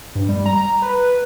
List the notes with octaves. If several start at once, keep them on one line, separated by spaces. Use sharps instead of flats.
G2
G3
A#5
B4